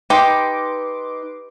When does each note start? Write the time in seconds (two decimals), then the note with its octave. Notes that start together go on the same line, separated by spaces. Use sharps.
0.10 D#4 G4 B4 C6 D6